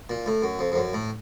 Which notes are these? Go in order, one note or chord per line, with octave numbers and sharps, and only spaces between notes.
A#2
A2
F#2
F2
F2
F#2
A2